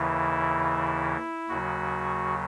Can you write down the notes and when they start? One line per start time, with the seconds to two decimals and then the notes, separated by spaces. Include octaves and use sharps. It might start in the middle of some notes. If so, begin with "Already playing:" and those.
Already playing: D#2 C#3 E3 E4
1.49 D#2 C#3 F#3 F#4